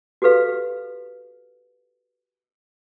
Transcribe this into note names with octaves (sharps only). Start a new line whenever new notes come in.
F#4 G4 A4 B4 F5